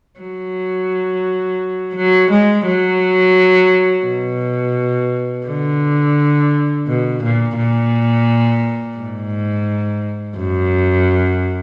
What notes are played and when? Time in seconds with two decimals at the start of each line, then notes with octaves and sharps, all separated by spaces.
0.20 F#3
1.95 F#3
2.30 G#3
2.66 F#3
4.06 B2
5.47 D3
6.87 B2
7.23 A#2
7.57 A#2
8.98 G#2
10.38 F#2